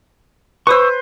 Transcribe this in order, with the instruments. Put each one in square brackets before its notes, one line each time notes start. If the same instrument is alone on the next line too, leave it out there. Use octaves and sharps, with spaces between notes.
[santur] B4 C5 [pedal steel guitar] C#6 D#6 E6